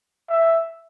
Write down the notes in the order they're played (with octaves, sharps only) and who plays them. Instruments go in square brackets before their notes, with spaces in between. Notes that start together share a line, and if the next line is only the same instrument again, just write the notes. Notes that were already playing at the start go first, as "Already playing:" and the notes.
[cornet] E5